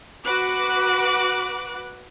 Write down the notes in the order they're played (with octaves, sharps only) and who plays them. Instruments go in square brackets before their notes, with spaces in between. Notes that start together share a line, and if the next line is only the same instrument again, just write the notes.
[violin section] F#4 B4 D6 F#6